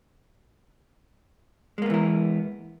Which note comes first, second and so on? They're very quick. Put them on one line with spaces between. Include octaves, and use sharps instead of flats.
G#3 A#3 B3 E3 A#4